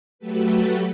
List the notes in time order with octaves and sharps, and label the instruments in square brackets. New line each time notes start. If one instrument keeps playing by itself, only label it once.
[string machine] F#3 A3 F#4 G4 A4 B4